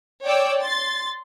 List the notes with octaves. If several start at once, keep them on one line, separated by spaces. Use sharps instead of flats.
C#5 D5 G5 D6 E6
C6 A6